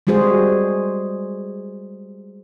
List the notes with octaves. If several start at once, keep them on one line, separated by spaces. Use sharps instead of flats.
G3 G#3 F#4 G#4 C5